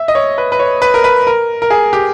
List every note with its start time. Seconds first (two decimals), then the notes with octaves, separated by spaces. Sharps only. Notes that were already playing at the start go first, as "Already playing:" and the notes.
Already playing: E5
0.08 D#5
0.15 C#5
0.38 B4
0.52 B4
0.59 C#5
0.82 B4
0.94 A#4
1.04 B4
1.27 A#4
1.62 A#4
1.70 G#4
1.93 G4